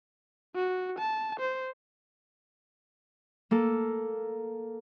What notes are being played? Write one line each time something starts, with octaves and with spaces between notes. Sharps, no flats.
F#4
A5
C5
A#3 A4